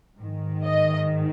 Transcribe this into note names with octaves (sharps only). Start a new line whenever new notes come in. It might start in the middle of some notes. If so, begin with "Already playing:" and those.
G#2 D#3
D#5